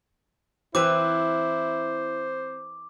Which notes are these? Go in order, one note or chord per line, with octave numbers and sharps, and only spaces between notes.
E3 C4 E4 B4 C5 D6